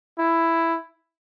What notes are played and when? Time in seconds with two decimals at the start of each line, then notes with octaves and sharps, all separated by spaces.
0.19 E4